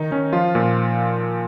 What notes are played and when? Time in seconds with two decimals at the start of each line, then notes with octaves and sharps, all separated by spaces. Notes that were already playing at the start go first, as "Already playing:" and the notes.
Already playing: D#3 D#4
0.11 D#3 C#4
0.33 F3 F4
0.55 A#2